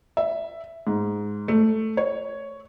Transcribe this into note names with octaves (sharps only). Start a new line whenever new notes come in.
E5
G#2
A3
C#5